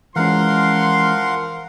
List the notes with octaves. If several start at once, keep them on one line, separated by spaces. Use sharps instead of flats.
E3 F3 G#3 C#4 A#4 F5 F#5 C6